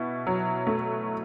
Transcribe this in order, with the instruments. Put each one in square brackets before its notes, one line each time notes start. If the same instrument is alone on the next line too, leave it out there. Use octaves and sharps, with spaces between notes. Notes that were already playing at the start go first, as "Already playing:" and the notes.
Already playing: [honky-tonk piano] B2 E4
F#3
A3